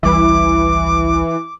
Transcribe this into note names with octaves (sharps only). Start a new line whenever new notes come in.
G#1 C#2 E3 G3 D6